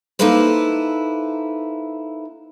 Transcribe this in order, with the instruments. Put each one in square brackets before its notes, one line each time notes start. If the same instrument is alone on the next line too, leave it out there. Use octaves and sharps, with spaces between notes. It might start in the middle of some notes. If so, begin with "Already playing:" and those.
[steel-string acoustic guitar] A#3 D#4 E4 A4 B4 C5